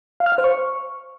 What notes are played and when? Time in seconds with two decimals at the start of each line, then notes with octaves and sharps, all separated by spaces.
0.20 F5
0.26 F6
0.32 F5
0.38 C5
0.44 C#6